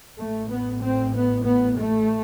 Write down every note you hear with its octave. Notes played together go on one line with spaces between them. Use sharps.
A1 A2 A3
B3
C4
B3
B3
A3